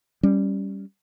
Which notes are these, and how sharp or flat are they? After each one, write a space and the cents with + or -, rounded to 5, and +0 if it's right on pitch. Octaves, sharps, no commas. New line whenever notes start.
G3 +0 C#4 +0